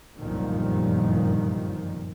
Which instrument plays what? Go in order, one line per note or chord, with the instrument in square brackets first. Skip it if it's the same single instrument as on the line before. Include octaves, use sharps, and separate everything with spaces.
[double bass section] G1 C2 F#2 A#2 D#3 F3